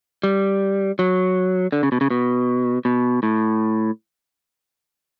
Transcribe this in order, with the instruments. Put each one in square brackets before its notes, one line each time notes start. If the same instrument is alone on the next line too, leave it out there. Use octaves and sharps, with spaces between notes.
[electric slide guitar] G3
F#3
D3
C#3
B2
C#3
B2
B2
A2